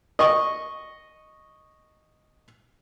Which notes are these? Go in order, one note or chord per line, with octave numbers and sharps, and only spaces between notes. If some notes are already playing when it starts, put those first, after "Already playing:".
D#5 C#6